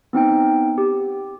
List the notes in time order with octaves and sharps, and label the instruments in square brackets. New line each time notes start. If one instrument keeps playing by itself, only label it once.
[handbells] B3 C4 D#4 G5
G4